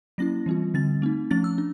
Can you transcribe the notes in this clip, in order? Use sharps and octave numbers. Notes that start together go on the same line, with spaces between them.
F#3 A#3 C#4 E4 A#6
E3 G3 C4 F4
D3 G3 C4 A6
A3 C4 D#4
F3 A3 C#4 A6
E6
D4